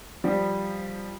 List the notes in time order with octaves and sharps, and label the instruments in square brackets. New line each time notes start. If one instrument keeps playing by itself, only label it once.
[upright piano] F3 G3